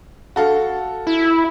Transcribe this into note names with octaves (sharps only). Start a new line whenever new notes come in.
F#4 A4 F5
E4